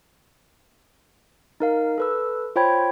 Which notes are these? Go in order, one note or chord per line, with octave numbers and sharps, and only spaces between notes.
D#4 A#4 F5
A4 B4 E6
F4 C5 C#5 G5 B5 G#6